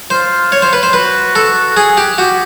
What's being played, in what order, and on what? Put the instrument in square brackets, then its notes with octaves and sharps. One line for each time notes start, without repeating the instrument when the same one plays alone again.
[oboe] F4 [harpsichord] C5
[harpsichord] C#5
C5
B4
C5
[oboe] F#4 [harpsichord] B4
[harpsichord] A4
G#4
G4
[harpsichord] F#4 [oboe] G4